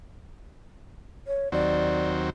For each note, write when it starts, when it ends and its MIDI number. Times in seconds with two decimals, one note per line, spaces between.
1.27 1.52 73
1.52 2.30 39
1.52 2.30 54
1.52 2.30 60
1.52 2.10 74